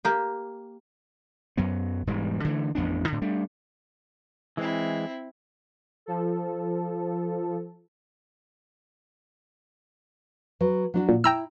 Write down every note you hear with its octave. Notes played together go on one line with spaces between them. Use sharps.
A#3 G4
F#2 F#3 B3
E1 G#2 E3 G3
D3 E3 A3
A1 F2 B3 D4
A2 D3
G3 A3 D4
E3 G#3 C4 E4
F3 A4
F#3 B4
F#3 D4 F#4
A#2
E4 G5 A#5 E6